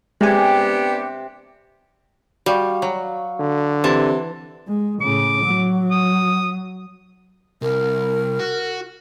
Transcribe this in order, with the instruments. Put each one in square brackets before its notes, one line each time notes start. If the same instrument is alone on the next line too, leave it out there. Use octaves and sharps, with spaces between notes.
[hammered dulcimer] C3 [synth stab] G#3 G#5 [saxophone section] B3 D4 G4
[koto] G3 [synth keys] F#4 F5 C#6
[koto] F#3
[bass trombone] D3
[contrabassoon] C3 [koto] E3 A5 [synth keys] C6
[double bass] G#3
[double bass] A2 C#3 [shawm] D6
[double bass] F#3
[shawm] D#6
[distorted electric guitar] C2 [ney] A#4
[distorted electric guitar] F#4